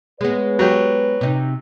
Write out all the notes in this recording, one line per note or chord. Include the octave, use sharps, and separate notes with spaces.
G#3 B3 B4 C#5
F#3 G4
C3 D#4